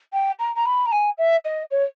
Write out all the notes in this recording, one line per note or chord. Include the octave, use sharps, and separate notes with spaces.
G5
A#5
A#5
B5
A#5
G#5
E5
D#5
C#5